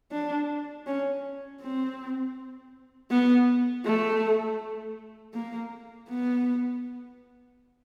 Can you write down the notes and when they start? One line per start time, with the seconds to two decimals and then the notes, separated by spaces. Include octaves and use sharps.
0.12 D4
0.87 C#4
1.61 C4
3.10 B3
3.85 A3
5.34 A#3
6.09 B3